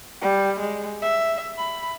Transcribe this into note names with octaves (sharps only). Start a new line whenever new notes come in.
G3
G#3
E5
B5